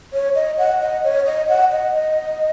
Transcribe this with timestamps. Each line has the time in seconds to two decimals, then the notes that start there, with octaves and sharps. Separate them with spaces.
0.13 C#5
0.35 D#5
0.58 F#5
0.81 D#5
1.04 C#5
1.26 D#5
1.49 F#5
1.72 D#5
1.94 D#5